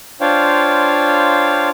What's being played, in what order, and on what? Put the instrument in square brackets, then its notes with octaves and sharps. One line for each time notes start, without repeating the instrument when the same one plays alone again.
[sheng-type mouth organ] D4 F4 C5 C#5 F5 G5